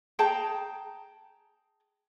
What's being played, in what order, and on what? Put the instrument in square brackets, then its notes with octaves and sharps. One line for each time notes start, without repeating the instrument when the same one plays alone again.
[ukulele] G#4 G5 A5 A#5